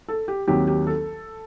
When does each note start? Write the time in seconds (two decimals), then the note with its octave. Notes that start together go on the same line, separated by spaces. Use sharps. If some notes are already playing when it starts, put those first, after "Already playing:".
0.08 A4
0.28 G4
0.48 D#2 D#3 F#3 C4 G4
0.67 G4
0.87 A4